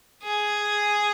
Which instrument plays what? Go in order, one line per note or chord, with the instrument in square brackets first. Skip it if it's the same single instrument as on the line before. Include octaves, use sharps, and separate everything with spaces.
[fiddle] G#4